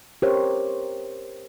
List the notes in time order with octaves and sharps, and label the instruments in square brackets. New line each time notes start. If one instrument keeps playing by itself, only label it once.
[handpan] G4 A#4 C5 C#5